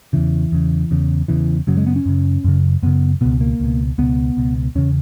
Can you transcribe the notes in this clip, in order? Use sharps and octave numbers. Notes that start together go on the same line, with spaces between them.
E2 C#3 E3
E2 C#3
E2 C#3
E2 C#3 E3
F#2 C#3 F#3
G#3
B3
C#4
F#2 C#3
F#2 C#3
F#2 C#3 B3
C#2 B2 B3
A#3
C#2 B2
C#2 B2 B3
C#2 B2
E2 C#3 C#4